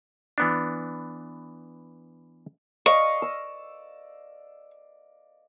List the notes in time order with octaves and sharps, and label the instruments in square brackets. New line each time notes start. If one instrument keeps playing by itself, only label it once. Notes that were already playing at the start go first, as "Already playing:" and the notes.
[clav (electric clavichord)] E3 B3 D4
[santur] D5 D#5 F5 [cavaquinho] C#6
[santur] E6